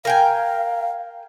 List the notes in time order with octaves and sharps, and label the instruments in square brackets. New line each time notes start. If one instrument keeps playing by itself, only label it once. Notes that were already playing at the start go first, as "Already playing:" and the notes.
[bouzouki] A#4 G5 G#5 [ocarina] F5